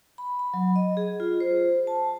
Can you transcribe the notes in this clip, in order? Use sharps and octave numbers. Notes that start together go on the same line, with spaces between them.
B5
B5
F#3
D#5
G#4
F4
C5
A5